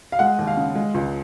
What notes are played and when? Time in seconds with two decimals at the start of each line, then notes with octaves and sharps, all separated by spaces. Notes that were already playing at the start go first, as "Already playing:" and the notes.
0.12 F5
0.19 G#3 F#5
0.39 D#2
0.47 F5
0.57 C#3
0.75 G#3
0.94 C#2